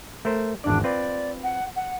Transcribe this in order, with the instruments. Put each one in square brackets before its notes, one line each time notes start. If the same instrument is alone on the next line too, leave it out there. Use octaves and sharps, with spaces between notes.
[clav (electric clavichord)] A3 A#4 C5
[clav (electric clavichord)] G#1 E2 D5 [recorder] D4
[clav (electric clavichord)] C4 F4 B4 [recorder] D5
[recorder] F#5
F#5